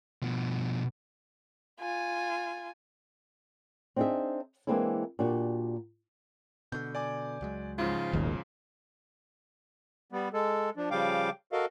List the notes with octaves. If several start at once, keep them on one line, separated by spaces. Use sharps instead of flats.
B2 F3
F4 G#5
C4 D4 D#4 G#4 D#5 E5
E3 G#3 A#3 C4 D4 E4
A#2 D4 F#4 G4
B2 D3 G6
D5 G#5 D6
C#2 F#3 G#3
G#2 C#3 F3 F4
D#1 G#1 D#2 B2
G3 B3
G#3 A4
F3 D4
C#3 F3 G3 F5 G5 D6
F#4 A4 A#4 D#5 F5